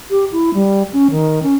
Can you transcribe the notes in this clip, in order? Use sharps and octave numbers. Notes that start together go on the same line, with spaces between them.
G4
E4
G3
C#4
D#3
C#4